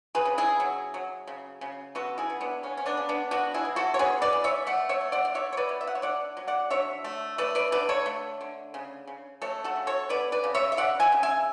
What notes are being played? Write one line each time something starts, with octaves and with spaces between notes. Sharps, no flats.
G#4 B4
C#3
E4 G#4
F#3
F#3
C#3
C#3
B3 F#4 A4
E4 G#4
B3
B3 D4
C#3 C#4
C#4
B3 D4
C#3
B3 D4
B3 D4 F#4
E4 G#4
E3
F#4 A4
C#5
B3 G#4 B4
B4 D5
E3
C#5 E5
A3 D5 F#5
C#5 E5
A3
D5 F#5
D5
B2 C#5 E5
C#5
B4 D5
B2
E5
F#5
C#5 E5
D3 D5 F#5
F#3
D5 F#5
D3 C#5 E5
A3
A3 B4 D5
B4 D5
D3 B4 D5
A4 C#5
A3
D3
C#3
C#3
A3 A4 C#5
F#4 A4
C#3
A4 C#5
B3 B4 D5
B4 D5
C#3
C#5 E5
E5
C#3 D5 F#5
E5 G#5
C#3
E5 G#5